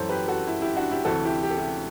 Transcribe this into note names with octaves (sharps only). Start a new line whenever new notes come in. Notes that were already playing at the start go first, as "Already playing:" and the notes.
Already playing: F#2 E3 A4 C5
G4 B4
F#4 A4
E4
E4 G4
D4 F#4
E4 G4
D2 C3 E3 F#4 A4
E4 G4
G4
A4
E4 G4